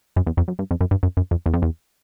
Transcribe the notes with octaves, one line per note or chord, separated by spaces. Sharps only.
F#2
E2
F2
F#2
G2
F2
F#2
G2
F#2
F#2
F2
E2
F2
E2